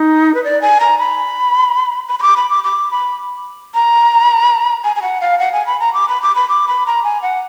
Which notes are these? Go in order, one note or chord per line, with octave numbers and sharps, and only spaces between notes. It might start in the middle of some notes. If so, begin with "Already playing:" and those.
Already playing: D#4
B4
D5
G#5
A#5
B5
B5
B5
D6
B5
D6
D6
B5
A#5
G#5
G#5
F#5
F5
F#5
G#5
B5
A#5
D6
B5
D6
B5
D6
B5
A#5
G#5
F#5